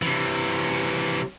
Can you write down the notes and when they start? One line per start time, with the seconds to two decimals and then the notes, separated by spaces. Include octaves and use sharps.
0.02 C3 E3